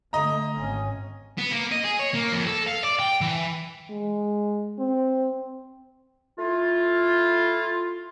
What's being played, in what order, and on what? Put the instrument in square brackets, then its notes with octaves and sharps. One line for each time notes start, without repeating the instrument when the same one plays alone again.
[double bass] D3 A3 [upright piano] D#5 A#5
[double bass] G#1 C#4
[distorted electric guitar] B3
A#3
D#5
G#4
C#5
A#3
F2
A4
F5
D5
G5
E3
[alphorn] G#3
C4
[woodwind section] A3 E4 F4